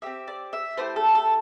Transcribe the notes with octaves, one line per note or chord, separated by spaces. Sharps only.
C4 G4 E5
D5
E5
A3 E4 G4 C5
A4
A4